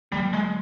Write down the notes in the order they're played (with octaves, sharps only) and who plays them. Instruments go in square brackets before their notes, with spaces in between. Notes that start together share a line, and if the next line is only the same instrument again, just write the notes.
[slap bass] D3 F#3 A#3 [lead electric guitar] G3
[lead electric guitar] G#3